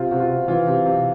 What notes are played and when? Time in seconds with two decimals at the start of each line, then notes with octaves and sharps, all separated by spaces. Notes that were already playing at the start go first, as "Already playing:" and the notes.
Already playing: C3 F4
0.11 C3 F#4
0.20 F4
0.30 C3
0.48 E3 F4
0.67 C3
0.85 C3